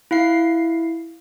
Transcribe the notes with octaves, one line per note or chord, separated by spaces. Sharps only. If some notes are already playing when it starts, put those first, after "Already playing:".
E4 F5 C7